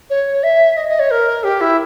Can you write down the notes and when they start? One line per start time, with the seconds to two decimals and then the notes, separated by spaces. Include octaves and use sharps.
0.10 C#5
0.43 E5
0.77 D#5
0.88 D#5
0.99 C#5
1.11 A#4
1.44 G4
1.61 E4